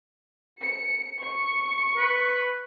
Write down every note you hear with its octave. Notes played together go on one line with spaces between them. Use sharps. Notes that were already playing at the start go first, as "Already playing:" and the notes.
C#7
C#6 C#7
B4